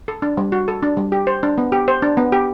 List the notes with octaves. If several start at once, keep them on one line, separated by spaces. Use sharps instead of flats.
A4
D4
G3
F#4
A4
D4
G3
G4
C5
D4
B3
G4
C5
D4
B3
G4